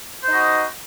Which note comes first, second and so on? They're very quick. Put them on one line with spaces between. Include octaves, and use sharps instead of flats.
C5 D#4 D#5 F#4